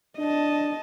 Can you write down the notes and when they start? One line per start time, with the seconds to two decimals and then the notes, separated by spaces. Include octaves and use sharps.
0.19 D4 D#5 A5